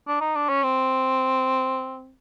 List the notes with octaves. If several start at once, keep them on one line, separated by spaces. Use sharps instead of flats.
D4
D#4
D4
C#4
C4